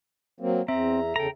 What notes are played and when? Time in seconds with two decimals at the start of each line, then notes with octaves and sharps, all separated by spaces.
0.40 F#3 A#3 C4
0.68 E2 C4 E5 A#5
1.16 E2 C#3 A4 G5 A#5